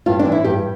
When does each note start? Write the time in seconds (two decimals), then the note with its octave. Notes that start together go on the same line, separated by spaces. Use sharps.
0.06 G2 F4
0.19 D4
0.25 E3
0.32 E4
0.44 G2 G4